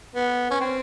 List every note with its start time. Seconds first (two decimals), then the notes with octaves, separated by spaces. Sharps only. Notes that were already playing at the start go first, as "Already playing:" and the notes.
0.15 B3
0.50 C#4
0.60 C4